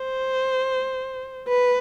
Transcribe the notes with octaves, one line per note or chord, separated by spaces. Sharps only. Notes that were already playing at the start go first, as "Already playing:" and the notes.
Already playing: C5
B4